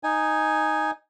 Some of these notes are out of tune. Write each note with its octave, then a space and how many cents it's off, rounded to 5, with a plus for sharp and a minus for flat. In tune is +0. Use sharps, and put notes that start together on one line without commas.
D#4 +0 G#5 +0